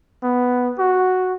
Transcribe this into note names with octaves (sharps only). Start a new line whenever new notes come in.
B3
F#4